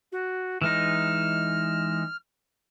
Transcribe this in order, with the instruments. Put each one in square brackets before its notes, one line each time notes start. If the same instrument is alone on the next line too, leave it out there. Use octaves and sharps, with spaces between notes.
[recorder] F#4
[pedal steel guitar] E3 G#3 D#4 [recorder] F6